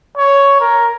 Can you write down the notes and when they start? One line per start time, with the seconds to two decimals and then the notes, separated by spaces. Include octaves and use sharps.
0.17 C#5
0.60 A#4